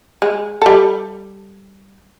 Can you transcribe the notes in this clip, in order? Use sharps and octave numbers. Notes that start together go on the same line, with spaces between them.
G#3
G3 A4